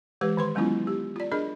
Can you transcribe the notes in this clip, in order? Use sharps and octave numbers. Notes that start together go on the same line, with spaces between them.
E3 G#3 G4 B4
D#3 B4 C6
F#3 G#3 B3 C#4 E4 F4
G4
F4 D5
D4 G#4 A#4 D#5